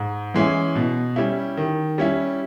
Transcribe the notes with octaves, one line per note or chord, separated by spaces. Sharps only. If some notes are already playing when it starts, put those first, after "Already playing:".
Already playing: G#2
E3 G#3 C#4 E4
B2
G3 C#4 E4
D#3
G3 C#4 E4